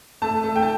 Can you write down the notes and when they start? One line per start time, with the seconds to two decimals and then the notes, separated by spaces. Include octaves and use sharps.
0.22 A3 A5
0.44 A3
0.56 G5
0.62 A5